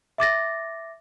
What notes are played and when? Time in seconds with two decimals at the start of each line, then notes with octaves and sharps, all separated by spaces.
0.18 E5 D6 A6 A#6